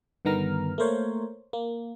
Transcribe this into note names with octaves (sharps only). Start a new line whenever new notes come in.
G2 D3 D#3 B3 A#5 F6
A3 A#3 A#4 C5 C#5
A#3